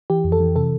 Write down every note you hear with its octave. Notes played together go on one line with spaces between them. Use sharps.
E3 G4
F2
A4
E3
C3 A4